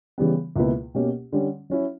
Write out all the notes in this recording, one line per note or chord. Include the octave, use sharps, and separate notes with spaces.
C#3 E3 G3 B3
C#2 B2 A#3 E4 B4
B2 A#3 C#4 G4
D3 G3 C#4
F#3 C#4 E4